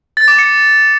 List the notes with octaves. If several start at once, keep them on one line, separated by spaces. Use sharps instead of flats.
A6
D6
C#7